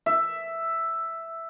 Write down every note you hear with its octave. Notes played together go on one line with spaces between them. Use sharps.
E5